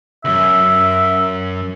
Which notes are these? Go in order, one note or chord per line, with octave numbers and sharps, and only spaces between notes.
C#2 F#2 E5